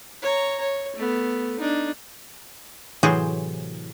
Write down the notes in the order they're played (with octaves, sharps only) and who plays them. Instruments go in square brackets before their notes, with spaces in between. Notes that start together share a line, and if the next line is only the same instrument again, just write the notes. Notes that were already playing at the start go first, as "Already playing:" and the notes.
[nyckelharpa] C#5 A#5
C#5
A3 B3
D4 D#4
[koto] A2 C3 E3 F#3 G#4 C5